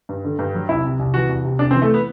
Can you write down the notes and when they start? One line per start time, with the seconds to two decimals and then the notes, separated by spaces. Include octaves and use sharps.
0.09 G2
0.25 D3
0.39 G2
0.54 F#3
0.69 C2 E4
0.85 C3
0.99 C2
1.14 E3 F#4
1.29 C2
1.44 C3
1.59 C2 D4
1.71 C4
1.74 E3
1.82 A3
1.94 B3